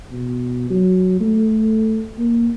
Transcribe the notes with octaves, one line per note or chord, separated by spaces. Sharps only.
B2
F#3
A3
A#3